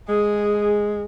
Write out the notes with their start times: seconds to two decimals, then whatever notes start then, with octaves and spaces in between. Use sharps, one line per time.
0.09 G#3 G#4